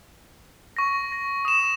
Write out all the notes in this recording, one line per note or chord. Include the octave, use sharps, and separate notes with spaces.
C#6 A#6
A#6
D#6 E7